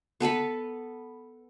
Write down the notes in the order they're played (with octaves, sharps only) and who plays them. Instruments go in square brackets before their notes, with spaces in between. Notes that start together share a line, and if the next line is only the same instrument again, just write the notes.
[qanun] B3 A4 B4 B5